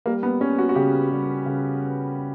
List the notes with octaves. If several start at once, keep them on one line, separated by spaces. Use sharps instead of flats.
G3 A#3
B3
G3 C#4
F#4
F#4
C#3 G4
G3
C#3